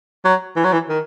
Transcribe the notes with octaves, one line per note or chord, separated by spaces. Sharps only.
F#3
E3
F#3
E3
D#3